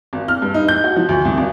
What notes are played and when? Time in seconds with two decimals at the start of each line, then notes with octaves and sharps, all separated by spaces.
0.13 G#1
0.28 F6
0.42 G2
0.54 D#4
0.68 G6
0.84 F#4
0.96 F3
1.09 D2
1.25 C2
1.38 G#1